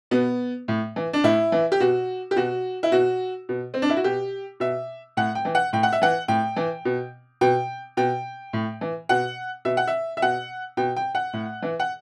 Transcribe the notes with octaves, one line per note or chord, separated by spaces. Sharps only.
B2 B3
A2
E3
D4
A2 E4
E3
G4
B2 F#4
G4
B2 F#4
E4
B2 F#4
B2
C4
D4
E4
F#4
B2 G4
B2 E5
A2 F#5
G5
E3
F#5
A2 G5
F#5
E5
E3 F#5
A2 G5
E3
B2
B2 G5
B2 G5
A2
E3
B2 F#5
B2 E5
F#5
E5
E5
B2 F#5
B2 G5
G5
F#5
A2
E3
F#5